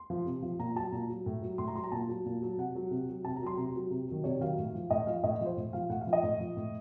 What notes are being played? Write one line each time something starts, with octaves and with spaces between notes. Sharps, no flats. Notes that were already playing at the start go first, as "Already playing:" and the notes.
Already playing: C6
F3
C3
F3
A#2 A#5
F#3 A5
A#2 A#5
F#3
A2
F#3
A2 C6
A#5
F#3 C6
A#5
A#2 A5
F#3
A#2
F#3
C3 F#5
F#3
C3
F#3
C3 A5
A#5
F#3 C6
C3 A#5
F#3
C3
D#3 F#3
C3 C#5
D#3 F#3 F5
A2
F3
A2 D#5
F3 F5
A2 D#5
F3 C5
A2
F3 F5
A2 F#5
F5
F3
D#5
A2
F3
A2